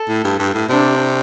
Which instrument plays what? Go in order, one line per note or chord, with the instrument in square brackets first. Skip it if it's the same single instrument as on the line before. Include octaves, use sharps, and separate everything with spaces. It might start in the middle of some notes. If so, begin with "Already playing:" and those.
Already playing: [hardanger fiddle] A4
[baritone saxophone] A2
G2
G2
A2
[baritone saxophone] C3 [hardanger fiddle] D4